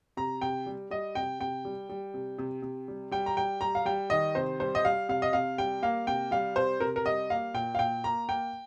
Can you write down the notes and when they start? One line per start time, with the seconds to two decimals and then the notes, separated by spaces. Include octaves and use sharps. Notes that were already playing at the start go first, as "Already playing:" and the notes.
0.17 C3 A#5
0.41 C3 G5
0.66 G3
0.90 G3 D#5
1.15 C3 G5
1.40 C3 G5
1.65 G3
1.89 G3
2.14 C3
2.38 C3
2.62 C3
2.88 G3
3.11 G3 G5
3.26 A#5
3.37 G3 G5
3.61 G3 A#5
3.75 F5
3.85 G3 G5
4.10 D#3 D#5
4.35 C3 C5
4.60 G3 C5
4.75 D#5
4.84 G3 F5
5.09 C3 F5
5.22 D#5
5.33 C3 F5
5.58 G3 G5
5.82 A#3 F5
6.07 C3 G5
6.31 G3 F5
6.56 C3 C5
6.80 C3 A#4
6.96 A#4
7.06 G3 D#5
7.30 A#3 F5
7.54 A#2 G5
7.75 F5
7.79 A#2 G5
8.04 A#3 A#5
8.29 A#3 G5